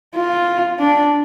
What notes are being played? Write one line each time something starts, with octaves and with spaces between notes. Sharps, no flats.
F4
D4